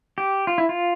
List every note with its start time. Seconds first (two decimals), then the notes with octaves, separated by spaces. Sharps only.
0.18 G4
0.47 F4
0.58 E4
0.69 F4